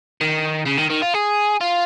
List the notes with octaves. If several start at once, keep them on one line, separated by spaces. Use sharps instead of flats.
D#3
C#3
D#3
D#3
F4
G#4
F4